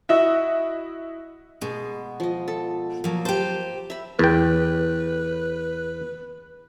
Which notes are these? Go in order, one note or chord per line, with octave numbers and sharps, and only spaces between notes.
E4 F#4 D#5 E5
B2 G#3
F3 D#5
A4
F3 F#3 A#3
G4 C5 A5
E5 B5
E2 B4 G5